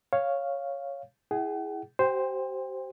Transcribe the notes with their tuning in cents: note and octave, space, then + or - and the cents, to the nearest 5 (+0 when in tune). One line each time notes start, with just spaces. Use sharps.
C#5 +0 F5 +0
E4 +0 G#4 +0 F#5 +45
G4 -40 C5 +0 G5 +30